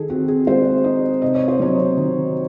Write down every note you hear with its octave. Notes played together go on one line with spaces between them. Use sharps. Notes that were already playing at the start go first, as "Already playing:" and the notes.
Already playing: D#3 G#4 A4
C4 F#4
G#4
G#3 C5
D#4 D#5
C3 D#5
C#5
C5
F#3 C#5
D#3